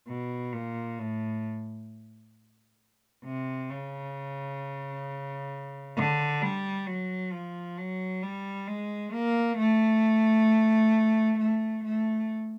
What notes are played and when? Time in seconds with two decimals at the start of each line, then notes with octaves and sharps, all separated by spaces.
0.08 B2
0.53 A#2
0.99 A2
3.25 C3
3.70 C#3
5.96 D3
6.41 G3
6.87 F#3
7.32 F3
7.78 F#3
8.23 G3
8.68 G#3
9.13 A#3
9.58 A3
11.39 A3
11.84 A3